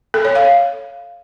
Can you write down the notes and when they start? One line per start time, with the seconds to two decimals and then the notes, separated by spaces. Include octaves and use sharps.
0.14 A4
0.25 C#5
0.35 F5